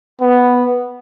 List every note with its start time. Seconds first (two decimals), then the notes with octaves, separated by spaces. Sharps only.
0.21 B3